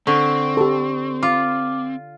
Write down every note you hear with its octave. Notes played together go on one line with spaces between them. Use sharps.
D3 C4 C#6
G4 A4
F4 D6